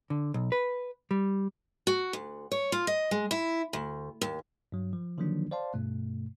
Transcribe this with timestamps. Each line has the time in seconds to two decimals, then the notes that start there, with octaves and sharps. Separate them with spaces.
0.10 D3
0.34 B1
0.52 B4
1.11 G3
1.87 F#4
2.13 D2
2.52 C#5
2.72 F4
2.87 D#5
3.11 G#3
3.31 E4
3.73 D2
4.21 D#2
4.72 G2 F#3
4.93 F3
5.18 D3 D#3 F3 F#3 A#3 D4
5.51 C5 D5 F5 A5 C6
5.74 G2 B2 A3